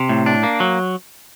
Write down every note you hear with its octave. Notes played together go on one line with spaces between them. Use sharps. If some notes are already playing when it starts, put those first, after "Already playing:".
Already playing: C3
A2
D4
A#3
F#3